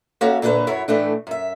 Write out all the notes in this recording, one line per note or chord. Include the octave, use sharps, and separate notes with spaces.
A#3 C#4 F#4 A4 C#5 E5
A#2 D3 D4 G#4 B4 C#5
F#2 F#3 E4 C#5
A2 E3 A3 D4
F#2 E5